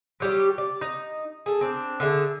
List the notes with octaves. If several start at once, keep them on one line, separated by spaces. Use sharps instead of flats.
F#3 G3 G4
D5
D#4
G#4 A4
C4 D4
D3 G#4 E5